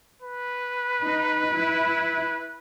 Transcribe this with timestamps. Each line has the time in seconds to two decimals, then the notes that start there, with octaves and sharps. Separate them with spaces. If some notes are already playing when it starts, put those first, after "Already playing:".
0.22 B4
1.01 D#4
1.53 E4